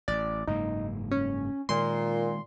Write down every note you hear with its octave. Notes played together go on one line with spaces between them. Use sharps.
A1 D5
F#1 G#2 A#3 D#4
C#4
A#2 D#3 G#3 C6